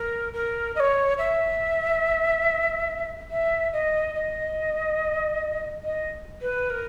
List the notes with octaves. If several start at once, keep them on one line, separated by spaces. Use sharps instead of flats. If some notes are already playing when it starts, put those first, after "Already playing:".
Already playing: A#4
A#4
D#5
C#5
E5
E5
D#5
D#5
D#5
B4
A#4